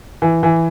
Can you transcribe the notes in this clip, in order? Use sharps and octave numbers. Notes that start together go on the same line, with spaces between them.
E3
E3